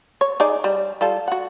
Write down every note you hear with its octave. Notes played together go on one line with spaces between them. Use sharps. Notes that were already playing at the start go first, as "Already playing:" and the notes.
C#5
D#4 G#4 D5
G3
G3 F4 A4
F#4 F#5